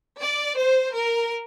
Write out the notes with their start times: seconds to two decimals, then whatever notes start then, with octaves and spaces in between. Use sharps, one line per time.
0.19 D5
0.57 C5
0.95 A#4